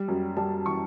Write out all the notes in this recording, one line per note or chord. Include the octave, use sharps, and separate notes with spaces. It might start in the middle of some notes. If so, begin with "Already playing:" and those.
Already playing: G3
F#2
G3 A5
E3 C#6